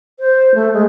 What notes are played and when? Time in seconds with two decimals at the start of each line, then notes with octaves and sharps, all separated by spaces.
0.19 C5
0.55 A3
0.74 G#3